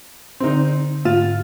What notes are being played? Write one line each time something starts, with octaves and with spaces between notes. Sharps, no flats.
D3 C4 D#4 C6
G#2 F4